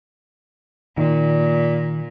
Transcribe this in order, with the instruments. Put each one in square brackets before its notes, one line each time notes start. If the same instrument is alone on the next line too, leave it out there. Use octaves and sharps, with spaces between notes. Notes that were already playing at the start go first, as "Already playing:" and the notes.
[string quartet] A#2 [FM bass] D#3